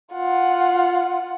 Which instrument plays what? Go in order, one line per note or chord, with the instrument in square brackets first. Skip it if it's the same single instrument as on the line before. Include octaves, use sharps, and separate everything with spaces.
[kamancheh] F4 F#5